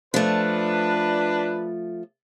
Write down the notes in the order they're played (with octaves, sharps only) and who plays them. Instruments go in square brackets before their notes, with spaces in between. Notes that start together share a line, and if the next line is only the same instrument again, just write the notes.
[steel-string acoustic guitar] F3 A3 [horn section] D4 B4